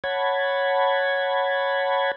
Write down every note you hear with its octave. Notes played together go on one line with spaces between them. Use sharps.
C#5 F#5 A5 B5 G#6